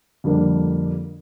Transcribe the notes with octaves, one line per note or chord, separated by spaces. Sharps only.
F2 D3 G3 A#3 D4